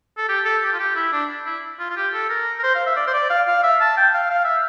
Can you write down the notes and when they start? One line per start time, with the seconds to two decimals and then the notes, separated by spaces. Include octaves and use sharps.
0.17 A4
0.28 G4
0.45 A4
0.62 G4
0.73 F4
0.79 G4
0.96 E4
1.12 D4
1.46 E4
1.79 F4
1.90 F4
1.96 G4
2.13 A4
2.29 A#4
2.59 A#4
2.63 C5
2.75 F5
2.86 E5
2.96 D5
3.07 C5
3.13 D5
3.30 F5
3.47 F5
3.63 E5
3.80 A5
3.97 G5
4.14 F5
4.30 F5
4.44 E5